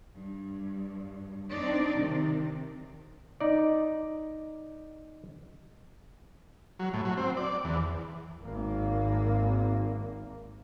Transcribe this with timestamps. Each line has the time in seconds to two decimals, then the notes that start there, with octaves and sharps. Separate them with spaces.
0.14 G2
1.51 C4 D4 D#4 D5
1.95 C3 D#3
3.40 D#4 D5
6.80 F#3
6.94 A2
7.05 F#3
7.17 C4
7.37 D5
7.64 E2
8.43 G#1 A#3